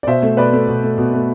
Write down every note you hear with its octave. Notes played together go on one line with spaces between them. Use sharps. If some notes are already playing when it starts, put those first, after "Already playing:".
D5
B2 C5 E5
A3
B2 B4 D5
A3
B2
A3
B2
A3